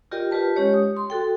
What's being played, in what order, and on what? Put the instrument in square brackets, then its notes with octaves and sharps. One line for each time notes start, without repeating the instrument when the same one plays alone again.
[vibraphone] F4 G4 A#4 D5 D#5 G5
F4 G4 B4 A5
G#3 C#4 G4 C#5 D#5
D#6
C6
F#4 A4 G5